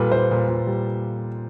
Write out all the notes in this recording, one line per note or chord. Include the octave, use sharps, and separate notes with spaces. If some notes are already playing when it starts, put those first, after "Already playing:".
Already playing: A#2 G3 A4 B4
A#2 C5
A#2
A#2
G3